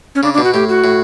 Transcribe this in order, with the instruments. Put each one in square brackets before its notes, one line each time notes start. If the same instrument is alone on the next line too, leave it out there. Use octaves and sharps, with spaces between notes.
[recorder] C#4
[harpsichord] C#3 [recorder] D4
[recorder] D4
[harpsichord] B2
[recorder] F#4
[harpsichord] A2 [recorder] G4
[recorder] F#4
[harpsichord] A2